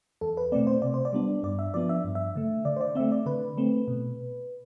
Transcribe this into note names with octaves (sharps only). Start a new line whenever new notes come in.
E2 A4
B4
B2 A3 C4 D5
C5
C3 D5
C5
D5
G3 B3 D4
G2 D5
E5
F3 B3 D4 D5
E5
G2
E5
D3 A3
D3 D5
C5
D5
A3 C4 E5
D5
D3 B4
A3 C4
B2